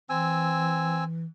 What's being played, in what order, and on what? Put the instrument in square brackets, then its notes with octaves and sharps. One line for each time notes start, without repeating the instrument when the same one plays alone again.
[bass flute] E3 [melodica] C4 G#5 E6